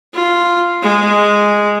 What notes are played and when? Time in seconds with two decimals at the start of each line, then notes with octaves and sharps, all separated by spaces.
0.14 F4
0.82 G#3